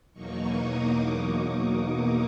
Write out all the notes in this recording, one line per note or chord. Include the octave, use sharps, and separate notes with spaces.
E2 B2 F#3 A#3 D#4 C#6
D#6
D6